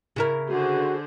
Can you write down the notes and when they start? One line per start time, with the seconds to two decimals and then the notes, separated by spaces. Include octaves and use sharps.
0.16 C#3 E4 A#4
0.48 D3 F#4 G#4 C5